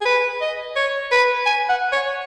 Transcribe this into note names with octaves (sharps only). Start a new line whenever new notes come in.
G#4
B4
D#5
C#5
B4
G#5
F#5
C#5